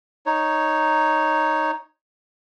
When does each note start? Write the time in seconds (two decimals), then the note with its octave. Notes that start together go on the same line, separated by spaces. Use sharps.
0.26 D#4 C#5